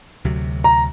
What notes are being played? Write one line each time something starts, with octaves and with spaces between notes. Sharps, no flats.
D2 C3 F#3
A#5